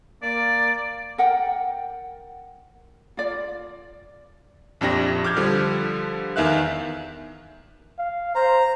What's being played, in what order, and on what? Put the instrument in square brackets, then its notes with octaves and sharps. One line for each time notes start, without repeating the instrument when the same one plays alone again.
[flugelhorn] A#3 [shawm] D5
[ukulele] A#4 F#5 G5
F4 D5
[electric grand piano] A#1 F2 D4 G4 A#6
D6 F6 G6 G#6
D3 F3 G3
E2 D#3 E5 F5 F#6
[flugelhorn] F5
[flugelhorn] C5 [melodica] A#5